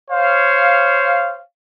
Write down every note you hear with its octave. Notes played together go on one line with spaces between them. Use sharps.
C5 C#5 F5